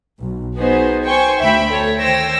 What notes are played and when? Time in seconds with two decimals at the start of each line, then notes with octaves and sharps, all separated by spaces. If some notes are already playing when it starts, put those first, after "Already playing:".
0.19 B1
0.57 B3 D#4 F#4 G#4 B4 C5
1.05 C5 G5 G#5 C#6
1.40 D2 E5 G5 B5
1.69 A4 C#5
1.98 D#3 C5 C#5 G5 E6 A#6